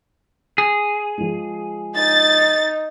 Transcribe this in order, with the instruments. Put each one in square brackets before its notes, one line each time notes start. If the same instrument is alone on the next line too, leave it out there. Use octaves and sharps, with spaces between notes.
[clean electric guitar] G#4
[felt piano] F3 G#3
[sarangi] D#4 [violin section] A6